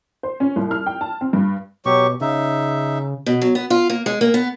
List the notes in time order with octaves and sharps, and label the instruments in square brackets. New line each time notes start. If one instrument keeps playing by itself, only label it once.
[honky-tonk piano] C5
C#4
C2
F6
G5
A5
C4
G2
[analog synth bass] B2 [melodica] F#3 G4 C#6
[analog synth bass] C#3 [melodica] D#4 E5
[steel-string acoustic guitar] B2
F#3
B3
F4
A#3
G#3
A#3
B3